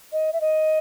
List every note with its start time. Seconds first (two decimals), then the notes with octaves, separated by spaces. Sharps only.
0.12 D#5
0.33 E5
0.41 D#5